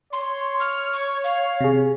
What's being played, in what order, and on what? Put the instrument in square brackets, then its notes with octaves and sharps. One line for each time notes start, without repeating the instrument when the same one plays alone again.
[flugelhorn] C#5 [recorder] C6
[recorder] F6
C#6
F5
[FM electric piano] C3 G#4